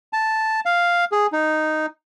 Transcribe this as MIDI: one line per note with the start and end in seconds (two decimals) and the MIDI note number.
0.13 0.60 81
0.66 1.05 77
1.12 1.27 68
1.32 1.86 63